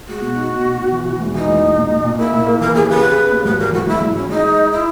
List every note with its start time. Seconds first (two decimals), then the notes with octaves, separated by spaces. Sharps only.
0.08 G#3 F#4
0.22 B2
0.36 D#4
0.49 B2
0.65 B2
0.78 B2
0.92 E3
1.06 E3
1.20 E1
1.34 E3 D#4
1.48 E1
1.63 E1
1.77 A#2
1.91 A#2
2.04 A#2
2.18 A#3 E4
2.33 A#2
2.47 A#3
2.61 E3 A#4
2.74 D#2 G#4
2.89 C#3 B4
3.03 C#3
3.17 C#3
3.32 D#2
3.45 G#1 B4
3.59 E3 A#4
3.73 G#1 F#4
3.87 G#1 E4
4.02 G#1
4.15 E3 C#4
4.29 C#2 D#4
4.44 G#3
4.57 G#3
4.72 E4